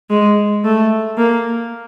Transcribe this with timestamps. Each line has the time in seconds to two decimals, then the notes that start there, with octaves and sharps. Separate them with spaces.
0.10 G#3
0.64 A3
1.17 A#3